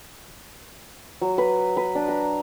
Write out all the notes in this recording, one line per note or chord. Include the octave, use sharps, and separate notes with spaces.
F#3
B4
B4
D4
A#5